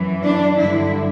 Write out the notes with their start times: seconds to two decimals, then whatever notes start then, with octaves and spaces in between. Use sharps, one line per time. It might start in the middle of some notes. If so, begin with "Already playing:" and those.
Already playing: F#2 E3
0.23 D4
0.59 G2 D3 E4